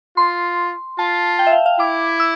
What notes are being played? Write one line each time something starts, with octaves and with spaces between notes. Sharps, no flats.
F4 C6
F4 A5
G5
E5
F5
F5
E4 D6
E6